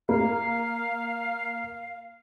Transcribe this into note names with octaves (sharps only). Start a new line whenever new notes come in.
A#3 F5